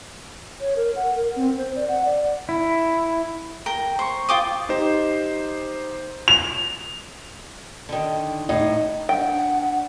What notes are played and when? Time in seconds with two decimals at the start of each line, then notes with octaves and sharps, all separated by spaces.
0.61 C#5
0.76 A#4
0.96 F#5
1.15 A#4
1.36 C4
1.58 C5
1.76 D5
1.88 F#5
2.05 D5
2.49 E4
3.66 A#4 G5
3.99 C5 C#6
4.29 F4 G5 D6 D#6
4.69 D#4 G4 C5
6.28 F7
7.89 D3 D#3
8.49 A2 D#4 D#5
9.09 D4 F#5 G5